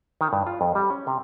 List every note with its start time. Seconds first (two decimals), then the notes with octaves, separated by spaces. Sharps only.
0.21 D#3
0.33 G2
0.47 F4
0.61 F2
0.75 G3
0.90 C#4
1.07 C3